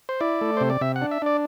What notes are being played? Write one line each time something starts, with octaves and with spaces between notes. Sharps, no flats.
C5
E4 D5
A3
C3 C5
D5
C3 E5
F#5
D4
E5
D4 D5